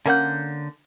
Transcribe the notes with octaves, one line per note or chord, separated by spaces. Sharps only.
D3 A#3 C#4 F#5 G6